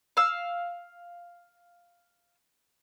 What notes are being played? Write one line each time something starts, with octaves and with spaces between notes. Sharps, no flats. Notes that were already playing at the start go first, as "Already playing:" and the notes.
F5 E6